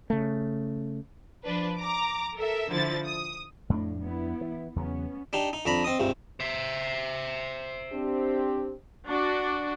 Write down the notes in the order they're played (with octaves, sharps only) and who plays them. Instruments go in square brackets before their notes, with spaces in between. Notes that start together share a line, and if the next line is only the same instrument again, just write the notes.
[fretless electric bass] C#3 A3
[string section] F3 D4 B4
A#5 D6
A4 A#4 E5
D3 F3 E4 A6
D#6
[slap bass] F2 C4 D4 [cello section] A2
[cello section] B3 E4
[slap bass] E3
[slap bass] E2 C#3 F#3 [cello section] B3 C#4
[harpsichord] D4 D#4 G4
D#4
F2 D4 A#5 B5
C4 D#5 D#6
C#2 G2 C3
[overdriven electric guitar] C5 E5
[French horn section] C4 D4 G4
[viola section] D4 F#4